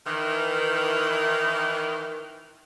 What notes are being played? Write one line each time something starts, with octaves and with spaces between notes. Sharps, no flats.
D#3 E3